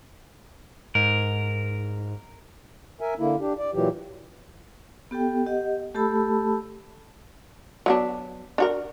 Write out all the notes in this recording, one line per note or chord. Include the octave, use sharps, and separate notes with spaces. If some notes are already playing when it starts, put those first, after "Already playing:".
G#2 A#4
A#4 E5 G#5
D3 A#3 E4
D4 G4
D5
A#2 E3 F#3 G4
B3 G4 A4 G5
G4 D#5 F#5
A3 G4 A4 A5 B5 E6
F#3 B3 D4
D4 F#4 A#4